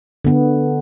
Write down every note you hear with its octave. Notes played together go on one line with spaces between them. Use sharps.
D3 B3